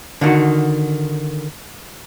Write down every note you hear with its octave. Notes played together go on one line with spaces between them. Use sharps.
D3 D#3 F#4